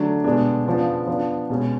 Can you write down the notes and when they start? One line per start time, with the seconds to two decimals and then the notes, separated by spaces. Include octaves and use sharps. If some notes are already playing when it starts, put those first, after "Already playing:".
Already playing: D3 F#3 A3 D4
0.24 B2 G#3 B3 D4
0.66 C#3 F3 B3 D4
1.08 F3 B3 D4
1.50 B2 G#3 C#4